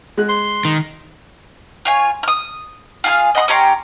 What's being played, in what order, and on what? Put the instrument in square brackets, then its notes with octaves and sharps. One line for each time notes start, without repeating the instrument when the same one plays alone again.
[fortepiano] G#3 F#6
[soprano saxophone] C6
[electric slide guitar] D#3
[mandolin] F4 C#5 G#5
D#6 F6
F4 G#4 F5
D#5 F#5 C6 D#6
C#4 G4 A#5 C6